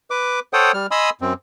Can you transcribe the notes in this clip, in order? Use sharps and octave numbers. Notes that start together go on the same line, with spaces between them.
B4 D6
A4 C5 C#5 F#5 G5 D#6
G3 F6
D#5 G#5 B5 C6 D#6 E6
F#2 C4